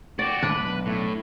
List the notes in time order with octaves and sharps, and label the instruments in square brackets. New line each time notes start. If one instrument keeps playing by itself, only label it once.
[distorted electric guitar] F#4 G4 [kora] D5
[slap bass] G#1 A2 G#3 [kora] D4 [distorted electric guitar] B4
[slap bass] B1
[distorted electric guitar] A2